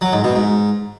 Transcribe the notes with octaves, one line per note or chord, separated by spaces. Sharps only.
F#3
G#2
B2
G#2